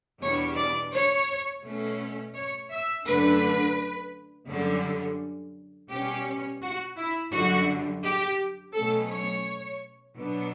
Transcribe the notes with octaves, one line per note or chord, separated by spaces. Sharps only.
E2 B2 G3 D4 C#5
D5
C#5
B2 A3 C#4
C#5
E5
F#2 D3 A3 D4 B4
F#2 D3 G3 C#4
B2 G3 C#4 G4
F#4
E4
F#2 D3 G3 F#4
G4
B2 F#3 A3 C#4 A4
C#5
B2 F#3 B3 D4